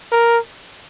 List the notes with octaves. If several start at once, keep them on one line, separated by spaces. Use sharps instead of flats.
A#4